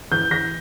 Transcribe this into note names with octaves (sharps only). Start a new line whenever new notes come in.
E3 G6
E3 A#6